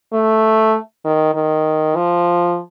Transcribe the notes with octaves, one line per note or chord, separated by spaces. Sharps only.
A3
D#3
D#3
F3